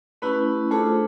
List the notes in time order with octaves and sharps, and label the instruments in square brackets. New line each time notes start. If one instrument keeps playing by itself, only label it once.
[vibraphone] A3 C#4 E4 G4 [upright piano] B4
[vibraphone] A3 D4 F4 G#4 C5 [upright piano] A4